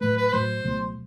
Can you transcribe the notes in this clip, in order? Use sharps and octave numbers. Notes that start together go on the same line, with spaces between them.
A2 F#3 A3 B4
B4
B4
A2 F#3 A3 C5
C#2 B2 F#3 A3